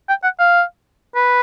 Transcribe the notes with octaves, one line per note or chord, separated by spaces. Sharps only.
G5
F#5
F5
B4